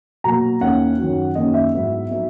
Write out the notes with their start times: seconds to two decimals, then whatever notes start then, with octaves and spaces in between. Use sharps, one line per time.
0.24 B2 F#3 A#3 A#5
0.61 D#2 D#3 A#3 C#4 E4 F#5
0.98 F#2 D#3 F#3
1.35 F#2 D#3 A#3 C#4 D#5
1.54 E5
1.73 G#2 F#3 B3 E4
2.10 F#3 B3 D#4